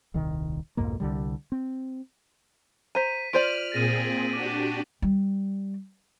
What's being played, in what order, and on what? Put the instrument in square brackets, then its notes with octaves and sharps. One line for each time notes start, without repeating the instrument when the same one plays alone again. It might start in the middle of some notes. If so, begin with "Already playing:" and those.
[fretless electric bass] D#1 C2 D#3
B1 F2 G#2 A#3
C2 D3 G3
C4
[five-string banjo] C5 A#5 [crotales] B6 D#7
[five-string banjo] F4 C5 D5 [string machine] F6 [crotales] D7 D#7 F#7
[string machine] A#2 C4 G#4 [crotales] A6 A#6 D#7
[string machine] D4 F#4 G4 [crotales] D6
[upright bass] G3